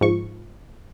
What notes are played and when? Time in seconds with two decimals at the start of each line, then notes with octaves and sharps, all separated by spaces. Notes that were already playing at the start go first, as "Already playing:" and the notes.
0.01 G#2 F3 C#6